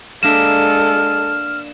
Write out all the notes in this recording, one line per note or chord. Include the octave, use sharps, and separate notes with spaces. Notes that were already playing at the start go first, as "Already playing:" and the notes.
G#3 A#3 D4 A4 E5 F6 E7